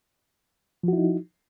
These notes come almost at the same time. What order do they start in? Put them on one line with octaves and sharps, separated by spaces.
F3 F#4 E4 D#4